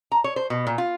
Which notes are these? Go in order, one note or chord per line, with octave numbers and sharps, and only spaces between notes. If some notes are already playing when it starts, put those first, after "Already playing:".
A#5
C#5
C5
B2
A#2
F4